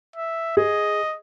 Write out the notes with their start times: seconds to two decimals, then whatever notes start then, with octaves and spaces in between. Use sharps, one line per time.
0.16 E5
0.57 G#4 D#5